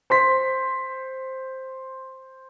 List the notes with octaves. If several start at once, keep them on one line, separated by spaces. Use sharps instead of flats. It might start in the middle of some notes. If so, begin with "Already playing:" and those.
C5 C6 B6